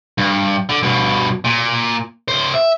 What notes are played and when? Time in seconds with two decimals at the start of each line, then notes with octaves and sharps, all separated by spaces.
0.18 G2
0.69 D3
0.83 G2 B2
1.44 A#2
2.28 C#2 C5
2.54 E5